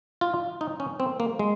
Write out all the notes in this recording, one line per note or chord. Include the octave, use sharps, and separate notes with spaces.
F4
D#4
C#4
C4
A#3
G#3